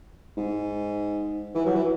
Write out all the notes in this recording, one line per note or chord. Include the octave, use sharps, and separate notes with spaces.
G#2
E3
F#3
E3